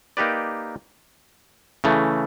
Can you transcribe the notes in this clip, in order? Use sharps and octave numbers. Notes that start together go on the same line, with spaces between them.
A#3 D#4 G4 B4 D5
C#3 E3 A3